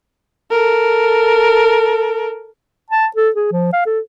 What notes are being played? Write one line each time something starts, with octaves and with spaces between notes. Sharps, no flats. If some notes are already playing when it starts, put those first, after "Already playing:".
A4 A#4
A5
A4
G#4
F3
F5
A4